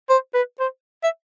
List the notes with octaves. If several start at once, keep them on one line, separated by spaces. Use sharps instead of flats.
C5
B4
C5
E5